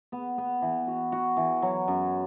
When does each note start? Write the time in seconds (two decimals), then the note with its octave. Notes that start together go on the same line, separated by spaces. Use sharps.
0.12 B3
0.38 B3
0.62 E3
0.87 F#4
1.12 F#4
1.37 E3
1.62 F#3
1.88 F#2